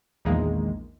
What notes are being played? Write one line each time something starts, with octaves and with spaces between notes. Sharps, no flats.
A#1 E2 D#3 G#3 A#3